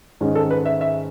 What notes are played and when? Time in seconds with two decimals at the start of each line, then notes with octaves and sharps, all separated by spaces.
0.21 G#2 D#3 G#3 C#4
0.35 A4
0.51 B4
0.66 E5
0.81 E5